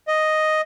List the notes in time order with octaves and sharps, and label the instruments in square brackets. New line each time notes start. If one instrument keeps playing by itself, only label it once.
[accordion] D#5